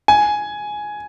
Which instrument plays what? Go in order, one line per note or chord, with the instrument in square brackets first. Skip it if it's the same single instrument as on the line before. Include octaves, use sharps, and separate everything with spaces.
[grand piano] G#5